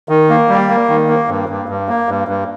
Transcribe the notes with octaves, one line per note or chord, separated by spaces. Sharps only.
D#3
A#3
G3
A#3
D#3
A#3
G2
G2
G2
A#3
G2
G2